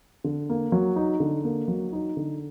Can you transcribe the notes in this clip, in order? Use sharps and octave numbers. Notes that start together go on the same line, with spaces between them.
D3
A#3
F#3
D#4
D3
A#3
F#3
D#4
D3